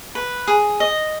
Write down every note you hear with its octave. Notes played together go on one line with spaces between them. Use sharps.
B4
G#4
D#5